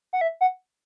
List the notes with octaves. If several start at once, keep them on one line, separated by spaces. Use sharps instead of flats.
F#5
E5
F#5